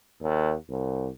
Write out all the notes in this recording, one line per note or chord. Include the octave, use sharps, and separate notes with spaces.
D#2
C2